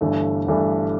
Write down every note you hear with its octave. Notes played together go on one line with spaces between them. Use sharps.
G1 G2 E3 A3 D4
G1 G2 E3 A3 D4